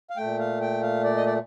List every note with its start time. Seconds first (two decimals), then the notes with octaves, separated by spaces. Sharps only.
0.10 F5
0.17 A#2 A3 G5
0.39 F5
0.61 G5
0.83 F5
1.04 D5
1.17 D#5
1.26 D5